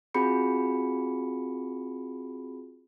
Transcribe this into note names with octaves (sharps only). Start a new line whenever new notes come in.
C4 F4 F#4 G#4 B5 C#7